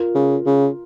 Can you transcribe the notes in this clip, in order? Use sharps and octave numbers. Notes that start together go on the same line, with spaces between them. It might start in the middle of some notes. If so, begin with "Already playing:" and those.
Already playing: F4 A#4
C#3
C#3